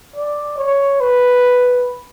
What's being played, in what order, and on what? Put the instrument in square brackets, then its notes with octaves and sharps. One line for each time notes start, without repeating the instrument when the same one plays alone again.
[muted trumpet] D5
C#5
B4